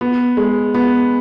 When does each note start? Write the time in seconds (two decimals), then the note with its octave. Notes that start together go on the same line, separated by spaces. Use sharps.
0.01 B3
0.37 G#3
0.75 B3